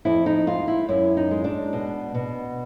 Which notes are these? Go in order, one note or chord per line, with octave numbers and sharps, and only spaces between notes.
F2 E4
D#4
G#3 F4
E4
F#2 E4
D#4
G#3
D4
B2
B2